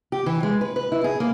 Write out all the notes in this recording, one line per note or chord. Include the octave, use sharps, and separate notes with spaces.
G4
E3
G#3
B4
B4
E4
G#4
A#3